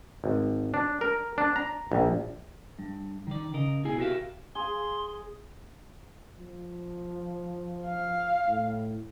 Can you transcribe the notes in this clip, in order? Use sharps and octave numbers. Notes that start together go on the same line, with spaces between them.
G#1
D4
A#4
D4
A#5
A#1
G2
D#3 D5
C#3 A#4 D#5
B2 E4 G#4 G#5
F#4 G4 A#4 C5 E5 F5
G#4 C6
F3
F5
A2